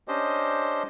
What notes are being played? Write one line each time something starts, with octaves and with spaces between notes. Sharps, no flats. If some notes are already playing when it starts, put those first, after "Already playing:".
C#4 D4 G4 C5 D#5